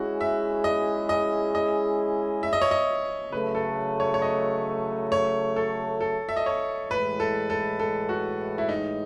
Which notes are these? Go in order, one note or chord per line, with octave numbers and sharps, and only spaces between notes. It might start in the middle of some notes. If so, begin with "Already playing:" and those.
Already playing: G#3 C#4 E4 F#4 G#4
E5
D#5
D#5
D#5
E5
D#5
C#5
D#5
C#3 F#3 A3 B4
A4
C#5
C#5
D#5
C#5
A4
A4
E5
D#5
C#5
A2 E3 G#3 B4
A4
A4
A4
F#4
E4
D#4